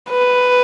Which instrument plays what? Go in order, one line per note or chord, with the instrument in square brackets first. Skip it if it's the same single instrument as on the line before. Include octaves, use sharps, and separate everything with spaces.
[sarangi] B4